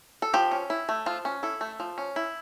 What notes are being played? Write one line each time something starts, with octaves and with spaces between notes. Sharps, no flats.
A4
F3 G4
C#4
E4
A3
F3 F4
C#4
E4 A4
A3
F3
C#4
E4